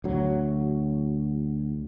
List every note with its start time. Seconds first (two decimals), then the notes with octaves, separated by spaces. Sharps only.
0.04 D2 F#3